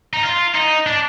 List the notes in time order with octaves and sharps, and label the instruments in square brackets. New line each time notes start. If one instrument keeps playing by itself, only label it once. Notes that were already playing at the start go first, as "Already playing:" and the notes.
[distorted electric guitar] D#4
F4
D#4
D4